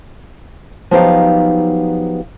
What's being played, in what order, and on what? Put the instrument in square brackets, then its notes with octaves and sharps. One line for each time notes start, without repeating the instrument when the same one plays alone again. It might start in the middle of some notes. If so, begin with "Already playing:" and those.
[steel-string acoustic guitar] F3 F#3 B3 D#4 G4 F5